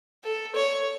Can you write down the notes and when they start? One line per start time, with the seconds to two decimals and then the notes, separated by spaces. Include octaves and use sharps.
0.24 A4
0.55 C#5